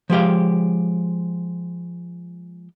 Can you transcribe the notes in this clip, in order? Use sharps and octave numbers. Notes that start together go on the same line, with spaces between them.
F3 G#3 G4 F5